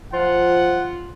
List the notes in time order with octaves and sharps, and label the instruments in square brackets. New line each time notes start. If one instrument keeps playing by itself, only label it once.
[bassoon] F3 [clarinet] F4 [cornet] F#5